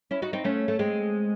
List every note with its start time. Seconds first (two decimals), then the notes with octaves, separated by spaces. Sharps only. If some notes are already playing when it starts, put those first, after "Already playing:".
0.11 C#4 E4
0.22 D#4 F#4
0.33 C4 D#4
0.44 A3 C#4
0.68 A3
0.79 G#3 C4